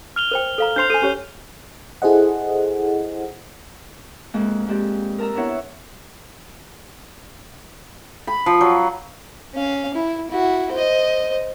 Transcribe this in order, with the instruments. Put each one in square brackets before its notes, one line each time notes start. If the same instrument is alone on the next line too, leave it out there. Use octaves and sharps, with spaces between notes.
[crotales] F6 F7 G7
[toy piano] A#4 C5 G5
A4 F5 A#5
[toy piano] D4 C5 C6 [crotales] G6 C7 F7
[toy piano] A4 G#5 [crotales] D#7
[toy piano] C#4 G4 C#5
[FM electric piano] E4 G#4 A4 C5 D#5 F#5
[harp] F2 G#3 A#3 F#6
G#3 C4 G4 D5
A#4 A5 A#5 E6
B3 D4 E4 C#5 F#5
[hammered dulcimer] B5
F3
F#3
[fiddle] C#4 F5
E4
E4 F#4
C5 D#5